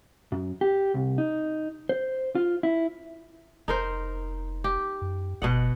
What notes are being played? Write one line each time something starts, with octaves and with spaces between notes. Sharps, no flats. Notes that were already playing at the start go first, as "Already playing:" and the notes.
F#2
G4
C2
D#4
C5
F4
E4
F1 D#4 A#4 C5
G4
F#2
G1 B2 D#5 F#5